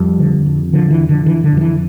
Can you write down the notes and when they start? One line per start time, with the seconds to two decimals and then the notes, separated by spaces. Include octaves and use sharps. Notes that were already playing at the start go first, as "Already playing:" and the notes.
Already playing: F2 G3
0.20 D3
0.46 F2
0.73 D3 F3
0.91 E3
0.99 F2
1.09 D3
1.26 D3 E3
1.44 D3
1.52 F2 F3
1.61 E3